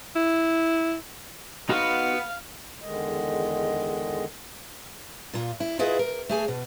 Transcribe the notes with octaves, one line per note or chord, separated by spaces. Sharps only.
E4
B3 D#4 F#4 F5
E2 D3 D#3 G#3 D#5
A#2 F4
E4
E4 F4 G#4 B4 D#5
A#4
A3 G#4 G#5
B2